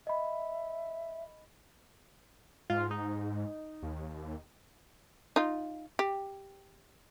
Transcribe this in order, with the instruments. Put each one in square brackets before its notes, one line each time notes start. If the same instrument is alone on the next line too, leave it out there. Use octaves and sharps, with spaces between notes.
[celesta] D#5 B5 [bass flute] E5
[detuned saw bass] G#2 [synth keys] F4
[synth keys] D#4
[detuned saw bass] D#2
[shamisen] D#4 F4
G4